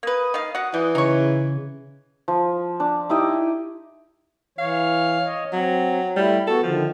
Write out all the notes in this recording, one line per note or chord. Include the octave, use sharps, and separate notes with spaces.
A#3 B4 D#6
D#3 F5
F#4 F#5
E3 G3
C#3 D#4 C#5
F3
D4
D#4 E4 G4 D#5
E3 C#5 F5
C#5 D#5
F#3 C4
G3 A3 E4
B3 F#4 A4
D3 D#3 F3